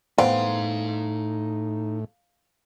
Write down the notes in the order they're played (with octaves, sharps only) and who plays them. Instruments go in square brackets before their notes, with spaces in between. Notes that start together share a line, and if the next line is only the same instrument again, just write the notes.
[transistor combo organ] A2 [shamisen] E3 B3 C4 [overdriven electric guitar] D#4 C6 [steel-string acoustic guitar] F5